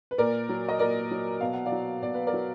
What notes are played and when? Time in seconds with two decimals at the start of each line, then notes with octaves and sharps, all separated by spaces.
0.11 B4
0.18 A#2 A#4 D5
0.49 F#3
0.69 D#5
0.79 A#2 A#4 D5
1.11 F#3
1.41 B2 F5
1.53 F#5
1.66 D5 F5
1.72 F#3
2.02 B2 D5
2.14 B4
2.27 A#4 D5
2.33 F#3